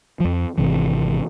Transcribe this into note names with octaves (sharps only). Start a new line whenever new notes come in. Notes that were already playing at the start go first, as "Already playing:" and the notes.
F2 F3
G#1 D2 C3 E3